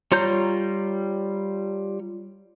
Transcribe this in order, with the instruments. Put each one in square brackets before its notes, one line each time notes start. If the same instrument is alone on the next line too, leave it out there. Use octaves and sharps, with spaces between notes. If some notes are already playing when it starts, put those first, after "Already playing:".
[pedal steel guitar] G3 F4 C#5 A#5 G6